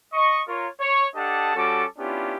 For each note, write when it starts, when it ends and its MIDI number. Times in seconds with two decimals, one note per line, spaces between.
0.13 0.41 75
0.13 0.41 85
0.48 0.67 65
0.48 0.67 70
0.48 0.67 73
0.80 1.06 73
1.15 1.54 62
1.15 1.54 67
1.15 1.54 69
1.15 1.54 75
1.15 1.54 78
1.15 1.54 81
1.55 1.84 55
1.55 1.84 61
1.55 1.84 66
1.55 1.84 69
1.55 1.84 81
1.55 1.84 86
1.99 2.36 59
1.99 2.36 61
1.99 2.36 62
1.99 2.36 64
1.99 2.36 65
1.99 2.36 67